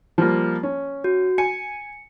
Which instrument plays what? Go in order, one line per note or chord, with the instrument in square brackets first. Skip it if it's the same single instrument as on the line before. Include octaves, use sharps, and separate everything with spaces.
[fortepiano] F3 G3 A#3
C#4
[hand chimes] F#4
[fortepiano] G#5 [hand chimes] C#7